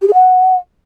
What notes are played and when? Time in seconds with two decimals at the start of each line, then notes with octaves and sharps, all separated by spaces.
0.02 G4
0.08 G#4
0.14 F#5